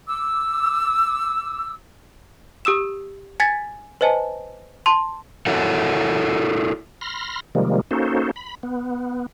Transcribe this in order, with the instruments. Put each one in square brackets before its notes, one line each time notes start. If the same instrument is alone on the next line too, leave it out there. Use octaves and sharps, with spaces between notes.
[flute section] D6 E6
[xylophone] G4 D#6 E6 E7
G#5 G#6 A6 B6
B4 C5 D#5 G#5 A5
A5 C6
[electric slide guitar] E4 F#4 A4 A#4 C#5 F#5
[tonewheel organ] B5 C6 F6 A#6
C3 D#3 F3 G3 G#3 A#3
A#3 C#4 D#4 F#4 A4 C5
B5
B3